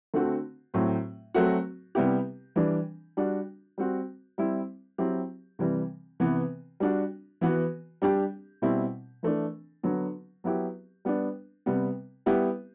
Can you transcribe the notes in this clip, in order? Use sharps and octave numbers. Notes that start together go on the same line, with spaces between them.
D3 A3 C4 F#4
A2 F#3 C4
F#3 A3 C4 F#4
C3 G3 B3 E4 G4
E3 G3 D4
G3 D4 F#4
G3 C4 F#4
G3 C4 E4
F#3 C4 E4 G4
C3 E3 G3
C3 E3 B3
G3 D4 F#4
E3 B3 F#4
G3 D4 G4
B2 G3 C4 E4
E3 A3 D4
D3 F#3 B3
F#3 B3 E4 G4
G3 B3 D4
C3 G3 B3
G3 B3 E4 G4